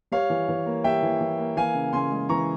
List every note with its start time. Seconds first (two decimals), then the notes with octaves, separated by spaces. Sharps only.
0.12 G3 C#5 F5
0.30 E3
0.49 E3
0.66 A#3
0.84 G3 E5 G5
1.03 E3
1.21 E3
1.39 A#3
1.57 E3 F5 G#5
1.75 C#3
1.93 C#3 G#5 C6
2.11 G#3
2.29 E3 A#5 C#6